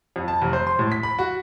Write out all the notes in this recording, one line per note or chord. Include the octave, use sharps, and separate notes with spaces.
F2
A5
F1
C5
C6
A2
B6
B5
F#4